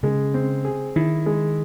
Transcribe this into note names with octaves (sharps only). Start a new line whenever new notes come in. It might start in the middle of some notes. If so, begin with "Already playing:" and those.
C#3 G#3
C4
G#4
D#3 E4
G#3